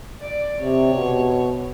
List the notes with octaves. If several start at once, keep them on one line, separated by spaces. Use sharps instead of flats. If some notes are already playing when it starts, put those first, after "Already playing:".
D5
C3 C#5
B2